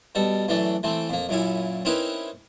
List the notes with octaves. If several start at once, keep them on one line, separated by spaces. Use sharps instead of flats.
B2 G3 A4
F#2 E3 A3 D4
E3 A3 C4
F2 A#3
F#2 A#2 C#4 E4
C4 C#4 D#4 E4 A#4 B4